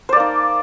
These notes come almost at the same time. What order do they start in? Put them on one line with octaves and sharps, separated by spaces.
C5 D5 A#3 D#4